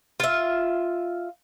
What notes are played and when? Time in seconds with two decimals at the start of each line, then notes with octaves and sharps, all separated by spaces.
0.20 F4 E5